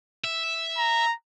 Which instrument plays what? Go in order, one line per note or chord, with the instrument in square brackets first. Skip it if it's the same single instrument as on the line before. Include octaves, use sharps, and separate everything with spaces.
[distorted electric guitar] E5
[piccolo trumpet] A#5